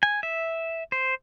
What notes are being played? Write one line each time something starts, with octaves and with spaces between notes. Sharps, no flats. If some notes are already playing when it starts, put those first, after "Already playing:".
G#5
E5
C5